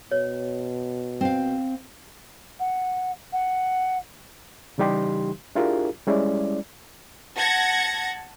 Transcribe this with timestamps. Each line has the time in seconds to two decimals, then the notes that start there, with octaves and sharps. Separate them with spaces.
0.11 B2 C#5
1.21 C4 F5
2.60 F#5
3.33 F#5
4.78 C#3 E3 G3 D#4 G4 C6
5.55 D4 E4 F4 G4 G#4 A#4
6.07 G3 G#3 C#4 E4 D5
7.37 F#5 A5 G#6 A#6 C#7